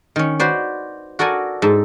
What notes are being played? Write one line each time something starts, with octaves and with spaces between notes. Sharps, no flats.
D#3 C#4
F#4 B4 C5 D5
F#4 A4 A#4 D5 G#5
G#2 A4